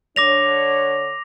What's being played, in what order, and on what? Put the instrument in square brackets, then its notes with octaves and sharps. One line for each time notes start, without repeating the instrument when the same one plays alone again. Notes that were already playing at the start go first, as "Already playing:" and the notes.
[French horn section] D3 D4 C#5 [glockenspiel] D6 A#6 F7